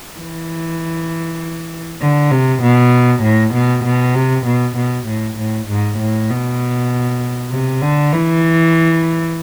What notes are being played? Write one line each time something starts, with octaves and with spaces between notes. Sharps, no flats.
E3
D3
C3
B2
A2
B2
B2
C3
B2
B2
A2
A2
G#2
A2
B2
C3
D3
E3